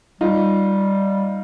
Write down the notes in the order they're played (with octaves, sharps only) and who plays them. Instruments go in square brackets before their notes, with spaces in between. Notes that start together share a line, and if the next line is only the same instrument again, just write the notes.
[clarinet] G3 [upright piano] D#4 F4